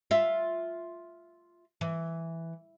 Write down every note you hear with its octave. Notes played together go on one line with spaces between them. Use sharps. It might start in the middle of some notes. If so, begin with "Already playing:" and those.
F4 E5
E3